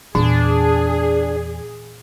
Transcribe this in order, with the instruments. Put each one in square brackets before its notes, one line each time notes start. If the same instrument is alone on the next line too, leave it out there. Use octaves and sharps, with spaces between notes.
[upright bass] E2 [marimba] A#2 [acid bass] D4 [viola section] G#4